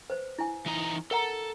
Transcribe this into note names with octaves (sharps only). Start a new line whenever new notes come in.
B4 C5
E4 G#5
E3 D#4 A#5
A4 A#4 F#5 A#5